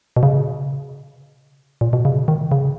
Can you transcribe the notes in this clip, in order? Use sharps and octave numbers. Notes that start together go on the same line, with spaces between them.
B2
C#3
A#2
B2
C#3
D#3
C#3